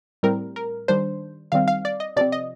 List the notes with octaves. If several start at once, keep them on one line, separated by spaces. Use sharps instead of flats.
A2 G3 C4 A#4
A#4
D#3 G3 D4 C5
D#3 G3 C4 F5
F5
D5
D#5
C3 F3 C4 D5
D#5